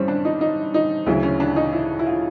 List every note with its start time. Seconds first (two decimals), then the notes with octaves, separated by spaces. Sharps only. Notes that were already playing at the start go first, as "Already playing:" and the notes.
Already playing: G2 E3 G3 C4 C#4
0.08 D4
0.25 D#4
0.41 D#4
0.74 D#4
1.06 D2 C#3 F#3 E4
1.23 C#4
1.40 D4
1.56 D#4
1.73 E4
1.99 E4
2.06 F4